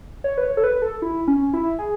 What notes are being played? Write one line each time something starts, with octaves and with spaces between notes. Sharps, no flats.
C#5
B4
C#5
A4
B4
A4
E4
C#4
E4
G#4